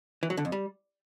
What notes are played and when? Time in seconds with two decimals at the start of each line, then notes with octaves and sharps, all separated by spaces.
0.23 E3
0.30 F#3
0.37 D3
0.45 F2
0.52 G3